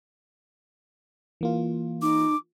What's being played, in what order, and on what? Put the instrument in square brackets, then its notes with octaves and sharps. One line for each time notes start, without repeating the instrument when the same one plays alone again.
[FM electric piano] E3 A#3 F4
[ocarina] D#4 [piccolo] D6